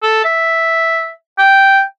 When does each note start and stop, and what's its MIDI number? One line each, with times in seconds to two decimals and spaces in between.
0.03 0.24 69
0.24 1.12 76
1.39 1.81 79